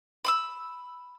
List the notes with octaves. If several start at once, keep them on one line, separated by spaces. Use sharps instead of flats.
B5 C6 E6